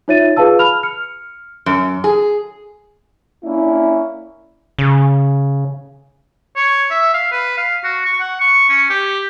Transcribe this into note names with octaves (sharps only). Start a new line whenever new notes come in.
D#4 F4 C#5 E5 A6 D#7
F4 G#4 B4 F5 A5 E6
B5 F6 F7
F6 C#7
F#2
G#4
A#3 C#4 D4 E4
C#3
C#5
E5
F5
B4
F5
F#4
C#6
F#5
C#6
C#4
G4